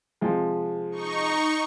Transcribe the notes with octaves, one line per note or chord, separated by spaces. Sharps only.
C3 F3 G#3
D#4 C#6